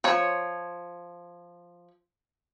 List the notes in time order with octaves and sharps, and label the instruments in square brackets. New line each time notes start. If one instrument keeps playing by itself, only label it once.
[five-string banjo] F3 C#5